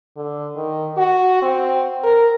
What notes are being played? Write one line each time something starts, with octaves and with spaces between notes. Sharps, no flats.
D3
D#3
F#4
C4
A#4